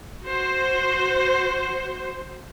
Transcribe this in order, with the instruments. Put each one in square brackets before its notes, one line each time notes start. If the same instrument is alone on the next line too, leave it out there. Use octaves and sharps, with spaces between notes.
[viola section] F#4 C5